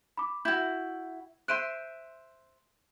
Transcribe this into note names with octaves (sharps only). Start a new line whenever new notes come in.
B5 D6
E4 F#4 G6
C5 E5 C6 F#6 D7 D#7